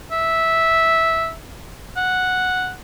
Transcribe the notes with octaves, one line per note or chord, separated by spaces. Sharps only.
E5
F#5